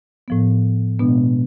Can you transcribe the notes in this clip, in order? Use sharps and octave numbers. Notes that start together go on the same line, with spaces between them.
A2 F3 B3
B2 G#3 B3 D4